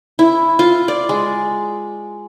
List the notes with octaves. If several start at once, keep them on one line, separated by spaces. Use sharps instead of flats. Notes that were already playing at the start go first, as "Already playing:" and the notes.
E4
F4
D5
G#3